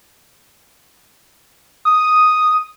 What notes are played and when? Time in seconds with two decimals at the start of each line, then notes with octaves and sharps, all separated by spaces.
1.85 D#6